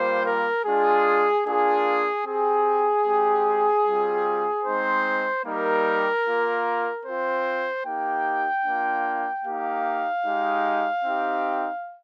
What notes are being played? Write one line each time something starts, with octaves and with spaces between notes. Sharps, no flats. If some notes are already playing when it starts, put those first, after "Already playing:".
Already playing: G3 A#3 F4 C5
A#4
G#3 D4 F4 G#4
A#3 D4 F4 G#4
C4 G4 G#4
G#3 C4 G4
G3 C4 F4
G#3 C4 D#4 C5
G3 A#3 D#4 G4 A#4
A#3 F4
C4 F4 C5
A#3 D#4 G4 G5
A#3 D4 F4
A#3 D#4 G4 F5
G#3 D#4 G4
C4 D#4 G4